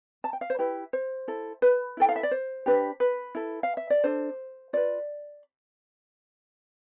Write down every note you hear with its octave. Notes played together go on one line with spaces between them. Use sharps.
A5
G5
F5
C5
E4 G4 B4
C5
E4 A4
B4
E4 A4 G5
F5
E5
D5
C5
D4 G4 B4
B4
E4 A4
F5
E5
D5
D4 A4 C5
F4 B4 D5